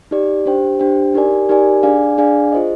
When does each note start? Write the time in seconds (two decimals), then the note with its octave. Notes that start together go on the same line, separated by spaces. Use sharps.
0.11 D#4 G4 D5
0.46 D4 G4 C5 G5
0.79 D4 G4 C5 G5
1.14 D#4 G4 A#4 D5 G#5
1.49 D#4 G4 A#4 D5 G#5
1.83 D4 G#4 D5 F5 G#5
2.18 D4 G#4 D5 F5 G#5
2.52 F4 G#4 C5 D#5